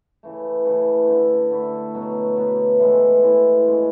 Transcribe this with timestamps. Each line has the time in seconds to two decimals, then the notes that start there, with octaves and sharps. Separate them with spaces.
0.23 C#3 E3 A3
0.65 C#3 E3 A3
1.08 D3 A3 E4
1.51 D3 A3 E4
1.94 B2 F#3 B3
2.36 B2 F#3 B3
2.80 A2 E3 G#3 B3
3.23 A2 E3 G#3 B3
3.66 D3 G#3 C#4